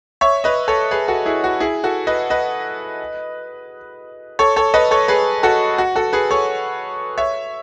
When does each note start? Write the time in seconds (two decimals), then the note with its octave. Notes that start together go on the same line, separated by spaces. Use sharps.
0.21 C#5 E5
0.44 B4 D#5
0.68 A4 C#5
0.91 G#4 B4
1.08 F#4 A4
1.26 E4 G#4
1.44 F#4
1.60 E4 G#4
1.84 F#4 A4
2.07 B4 D#5
2.30 B4 D#5
4.39 A4 C#5
4.56 A4 C#5
4.74 B4 D#5
4.91 A4 C#5
5.08 G#4 B4
5.43 F#4 A4
5.78 F#4
5.96 F#4 A4
6.13 G#4 B4
6.31 A4 C#5
7.18 C#5 E5